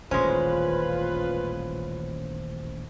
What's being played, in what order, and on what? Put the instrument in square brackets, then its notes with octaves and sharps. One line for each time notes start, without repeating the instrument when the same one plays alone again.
[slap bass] D#1 A1 D#3 [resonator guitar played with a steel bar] G#3 C#4 [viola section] F4 B4 [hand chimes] C5